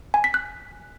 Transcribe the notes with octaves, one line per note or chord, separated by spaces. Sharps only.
G#5
B6
F#6